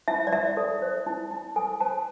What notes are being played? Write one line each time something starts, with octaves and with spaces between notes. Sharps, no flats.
E4 E5
D5
E4 E5
A4
C5
E4
E4
A4 G#5
C5 A5